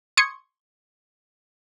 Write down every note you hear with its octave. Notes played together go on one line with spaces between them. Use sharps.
C6 C#6 D#6 G#6 C#7